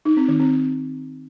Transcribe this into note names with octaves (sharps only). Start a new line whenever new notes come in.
D#4
C4
D#3
C4